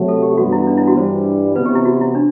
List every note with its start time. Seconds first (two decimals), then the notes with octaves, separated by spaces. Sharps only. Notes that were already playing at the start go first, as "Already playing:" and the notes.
Already playing: C3 F#3 A3
0.08 A4
0.22 G4
0.38 G2 E3 B3 F#4
0.52 E4
0.67 D4
0.77 E4
0.87 F#4
0.96 G2 E3 G3 C5
1.56 C3 E3 B3 B4
1.66 G4
1.75 E4
1.85 F#4
2.01 E4
2.15 D4